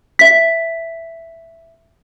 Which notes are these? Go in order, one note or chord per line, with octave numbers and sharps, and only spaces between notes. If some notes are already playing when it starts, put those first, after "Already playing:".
E5 B6